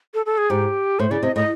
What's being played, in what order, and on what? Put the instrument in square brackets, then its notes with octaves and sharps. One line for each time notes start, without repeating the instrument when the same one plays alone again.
[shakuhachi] A4
A4
G#4
[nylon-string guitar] G#2 [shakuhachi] G4
[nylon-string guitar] A2 [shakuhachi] C5
[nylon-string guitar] C#3 [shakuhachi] D5
[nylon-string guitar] C3 [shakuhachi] D#5
[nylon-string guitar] A2 [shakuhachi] D#5